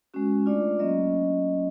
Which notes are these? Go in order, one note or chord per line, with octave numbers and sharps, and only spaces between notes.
G#3 C#4 F#4
A3 D4 F4 D5
F#3 A#3 C#4 D#5